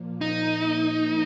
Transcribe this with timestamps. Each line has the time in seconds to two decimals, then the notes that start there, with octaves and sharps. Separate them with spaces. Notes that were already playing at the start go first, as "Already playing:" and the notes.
Already playing: A#2 F3 A#3
0.21 D#4